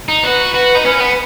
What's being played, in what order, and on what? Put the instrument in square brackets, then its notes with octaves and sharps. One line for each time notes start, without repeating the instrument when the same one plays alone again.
[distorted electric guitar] D#4
[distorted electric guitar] F#4 [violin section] B4
[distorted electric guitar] F#4
D#4
C#4
B3